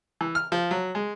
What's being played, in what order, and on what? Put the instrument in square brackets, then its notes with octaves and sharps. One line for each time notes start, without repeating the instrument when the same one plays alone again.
[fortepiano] E3
F6
F3
F#3
G#3